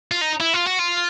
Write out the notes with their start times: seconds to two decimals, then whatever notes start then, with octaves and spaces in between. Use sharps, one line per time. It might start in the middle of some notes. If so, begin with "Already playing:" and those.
0.11 F4
0.21 D#4
0.40 E4
0.54 F4
0.67 F#4
0.79 F4